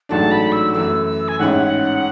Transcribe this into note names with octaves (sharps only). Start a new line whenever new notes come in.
A1 G#2 F#3 A3 D4 A5
B5
E6
F#2 E3 A3 E6
E6
G#5
A1 G#2 G#3 C#4 E4 F#5